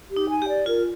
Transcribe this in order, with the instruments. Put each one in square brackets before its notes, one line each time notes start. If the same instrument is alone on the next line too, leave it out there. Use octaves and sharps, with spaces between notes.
[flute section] G4
[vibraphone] D#4
[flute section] G#5
[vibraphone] G4
[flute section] D5
[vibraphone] F4 [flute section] A#4